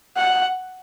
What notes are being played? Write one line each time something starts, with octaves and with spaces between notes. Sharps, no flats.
F#5